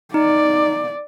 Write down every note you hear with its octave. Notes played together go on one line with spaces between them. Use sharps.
D#4 D5